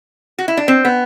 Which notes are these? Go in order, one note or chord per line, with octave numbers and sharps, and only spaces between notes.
F#4
E4
D4
C4
B3